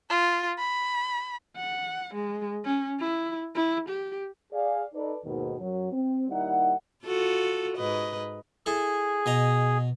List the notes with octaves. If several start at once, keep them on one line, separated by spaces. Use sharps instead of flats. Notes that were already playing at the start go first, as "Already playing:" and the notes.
F4
B5
F#5
G#3
C#4
E4
E4
G4
G#4 D5 F5
D#4 A4 B4 D5
D#2 G#2 B2 D#3
F#2 F#3
C4
D#2 G3 D#4 E4 A#4 F#5
F4 F#4 A4
G#2 B4 D#5
E4 G#4 A4
B2 D#5 A#5